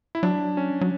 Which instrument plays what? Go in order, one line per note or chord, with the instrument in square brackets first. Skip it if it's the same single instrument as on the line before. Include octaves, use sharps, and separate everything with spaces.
[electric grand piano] E4
[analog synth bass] F#3 [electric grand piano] D4
[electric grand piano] C#4
[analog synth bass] F#3